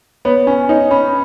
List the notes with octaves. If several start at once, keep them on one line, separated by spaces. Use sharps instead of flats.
B3 C#5
C#4 G#5
D#4 C#5
C#4 B5